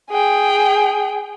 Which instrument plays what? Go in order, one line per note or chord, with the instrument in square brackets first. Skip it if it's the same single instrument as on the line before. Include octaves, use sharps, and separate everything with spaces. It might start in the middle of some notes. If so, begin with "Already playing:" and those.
[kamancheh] G#4 G5